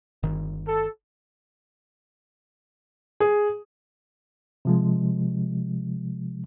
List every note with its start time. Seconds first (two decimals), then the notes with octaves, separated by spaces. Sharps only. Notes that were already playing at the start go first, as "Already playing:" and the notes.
0.23 G1 D#3
0.66 A4
3.20 G#4
4.65 C3 F3 G#3